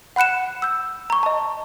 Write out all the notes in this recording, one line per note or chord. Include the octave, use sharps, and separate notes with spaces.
F#5 B5 F#6 C#7 E7
E6 G6
A#5 C#6
D#5 A5